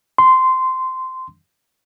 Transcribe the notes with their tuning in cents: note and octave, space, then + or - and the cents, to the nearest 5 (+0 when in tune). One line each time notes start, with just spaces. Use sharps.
C6 -15